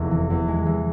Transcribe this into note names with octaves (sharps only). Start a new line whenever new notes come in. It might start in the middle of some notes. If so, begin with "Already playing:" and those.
Already playing: F1 E2 G#3
E3
E2
G#3
E3